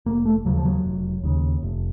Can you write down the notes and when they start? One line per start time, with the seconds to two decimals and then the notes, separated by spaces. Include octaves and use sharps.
0.06 F1 A#3
0.26 A3
0.45 D#2 C#3 F#3
0.57 F3
0.65 F#3
0.85 F1
1.23 D#2 C#3
1.63 F1